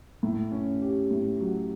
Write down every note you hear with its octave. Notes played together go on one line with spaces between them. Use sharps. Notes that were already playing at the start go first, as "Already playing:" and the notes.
A2
C#4
G4
A2
F#3